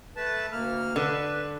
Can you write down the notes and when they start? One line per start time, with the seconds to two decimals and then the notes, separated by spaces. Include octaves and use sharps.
0.16 A3 B4 A5
0.52 D2 A#3 F6
0.96 D3 B4